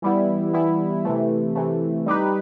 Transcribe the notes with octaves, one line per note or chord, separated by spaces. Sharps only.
E3 G3 B3 E4
E3 G3 B3 E4
C3 E3 A3
C3 E3 A3
G3 D#4 G4 B4